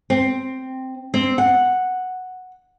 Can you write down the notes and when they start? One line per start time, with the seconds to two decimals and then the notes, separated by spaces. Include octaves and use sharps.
0.10 C4
1.14 C4
1.38 F#5